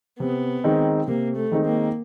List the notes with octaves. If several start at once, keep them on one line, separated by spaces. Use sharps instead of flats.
C3 B3
D#3 G#3 C4 D#4
C3 A#3
A3
D#3 G#3 C4 D#4
A#3